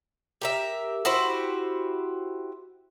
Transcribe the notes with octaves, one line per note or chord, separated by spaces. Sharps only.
G4 A#4 E5
E4 F#4 G4 C5